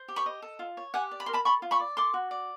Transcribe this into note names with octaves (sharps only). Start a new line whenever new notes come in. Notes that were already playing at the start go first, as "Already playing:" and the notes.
Already playing: C5
G4
B5 C#6
D#5
A4
F4
C#5
G4 F#5 G#5
D5
B5
A#4 C6
A5 B5
A4 B5 C#6
F4
B5 C#6
D5
A4 C6 D6
F#4
D5